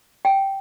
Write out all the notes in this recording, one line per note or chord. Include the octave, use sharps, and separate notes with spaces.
G5